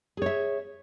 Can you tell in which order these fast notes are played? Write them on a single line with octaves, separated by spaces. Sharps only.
G#4 C#5 E5